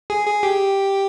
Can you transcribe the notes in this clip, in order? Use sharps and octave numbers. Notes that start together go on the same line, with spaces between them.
G#4
G#4
G4